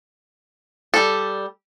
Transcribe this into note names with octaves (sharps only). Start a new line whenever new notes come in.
G3 A4